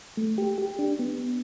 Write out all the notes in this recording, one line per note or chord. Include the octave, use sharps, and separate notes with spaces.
A3
G4
G4
D4
B3